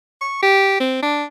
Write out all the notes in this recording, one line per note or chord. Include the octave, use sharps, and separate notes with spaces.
C#6
G4
C4
D4